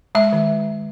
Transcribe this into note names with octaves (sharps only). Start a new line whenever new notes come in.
G#3 E5
D#3